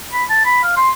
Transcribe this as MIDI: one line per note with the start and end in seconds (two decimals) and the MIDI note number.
0.13 0.23 83
0.30 0.40 81
0.45 0.61 83
0.63 0.73 77
0.77 0.90 84